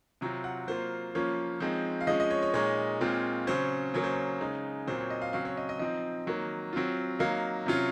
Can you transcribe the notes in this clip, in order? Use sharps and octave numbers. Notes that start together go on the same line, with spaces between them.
C3 F#3 C4 F4 A#5
F#5
F#3 A#3 F4 C5
F3 A#3 C#4 F4 C#5
F3 G#3 C4 D#4
F5
F3 G#3 C#4 D#5
D#5
C#5
C#5
A#2 G#3 D#4 C#5
A#2 G#3 C4 F4
C#3 F#3 C#4 C5
C#3 F#3 A#3 C#5
C5
C#5
C#3 G#3 D#4
A#2 F#3 C4 C5
C#5
D#5
F5
C#3 F#3 C4 F5
C#5
D#5
D#5
F3 C4 D#4 D#5
D#3 F#3 A#3
F#3 C4 F4
F#3 A#3 D#4 F5
C3 F#3 C#4 F4